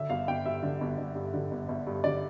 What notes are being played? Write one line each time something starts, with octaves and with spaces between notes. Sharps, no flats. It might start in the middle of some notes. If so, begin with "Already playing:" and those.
Already playing: D3 E5
G1 F5
G1 G5
G2 E5
D3
G1
G1
G2
D3
G1
G1
G2
D3 D5